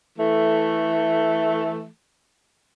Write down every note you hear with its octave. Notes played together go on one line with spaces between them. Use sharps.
E3 A3